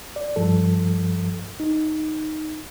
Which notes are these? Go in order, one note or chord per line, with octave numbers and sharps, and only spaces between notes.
D5
G2 F3 A4
D#4